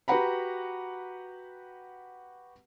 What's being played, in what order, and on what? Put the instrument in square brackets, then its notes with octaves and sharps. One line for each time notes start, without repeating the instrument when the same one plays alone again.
[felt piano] F#4 G4 B4 F#5 A#5 B5